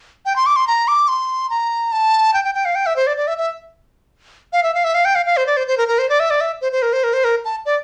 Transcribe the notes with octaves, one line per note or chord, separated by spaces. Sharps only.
G5
C6
D6
C6
A#5
D6
C6
A#5
A5
G5
G5
G5
F5
G5
E5
C5
D5
D5
E5
E5
F5
E5
F5
E5
F5
G5
F5
F5
C5
D5
C5
C5
A#4
A#4
C5
D5
E5
D5
E5
C5
C5
A#4
C5
A#4
C5
A#4
A5
D5